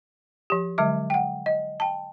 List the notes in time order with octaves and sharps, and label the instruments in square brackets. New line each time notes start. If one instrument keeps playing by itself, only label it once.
[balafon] F3 G4
D3 F#3 G#3 E5 D6
F#5 G5
D#5
G5 A5